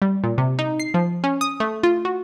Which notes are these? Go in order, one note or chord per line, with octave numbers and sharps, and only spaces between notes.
G3
A#2
C3
D#4
C7
F3
C#4
D#6
A3
F4
F#4